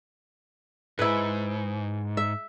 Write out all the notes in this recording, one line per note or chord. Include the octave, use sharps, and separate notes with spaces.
G#2 E4 B4
E5